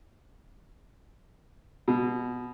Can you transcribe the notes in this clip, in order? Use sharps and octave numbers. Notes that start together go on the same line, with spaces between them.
B2